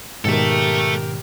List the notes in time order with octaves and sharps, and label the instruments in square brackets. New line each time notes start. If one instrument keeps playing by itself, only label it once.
[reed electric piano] G#2 B2 D#3 [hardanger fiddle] G4 A#4 [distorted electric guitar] A4 E5